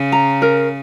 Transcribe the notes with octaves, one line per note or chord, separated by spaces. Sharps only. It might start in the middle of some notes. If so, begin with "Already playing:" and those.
Already playing: C#3
A#5
A#4